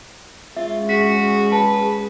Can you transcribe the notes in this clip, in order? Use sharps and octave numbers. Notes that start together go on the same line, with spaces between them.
G#3 C#4 F4 E5
F#4 G#4 B6
B4 A5